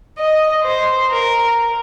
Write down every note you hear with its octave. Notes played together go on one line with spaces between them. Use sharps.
D#5
C5
A#4